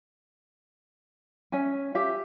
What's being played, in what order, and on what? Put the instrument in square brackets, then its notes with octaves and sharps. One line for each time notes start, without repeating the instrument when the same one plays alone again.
[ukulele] C#4 C#5 E5 G#5
G4 E5 F5